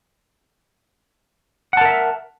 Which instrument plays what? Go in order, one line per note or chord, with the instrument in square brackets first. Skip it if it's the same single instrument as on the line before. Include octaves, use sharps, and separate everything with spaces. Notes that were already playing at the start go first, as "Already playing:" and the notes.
[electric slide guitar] F#5
A5
A#4
E5